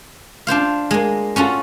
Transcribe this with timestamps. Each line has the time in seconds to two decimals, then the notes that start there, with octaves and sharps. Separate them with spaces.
0.47 D4 F4 C5 F5
0.91 G#3 A#3
1.36 C#4 F4 F#4 A4